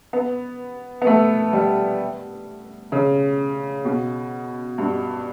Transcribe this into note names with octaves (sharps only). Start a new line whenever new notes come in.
B3
B3
A3
G3
C#3
B2
G2